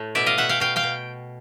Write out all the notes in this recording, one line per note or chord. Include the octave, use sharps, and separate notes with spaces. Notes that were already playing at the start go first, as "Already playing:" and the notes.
Already playing: A2 A3
B2 D5 E5
D#5 F5
B2 E5 F#5
F5 G5
B2 F5 G5
F5 G5
B2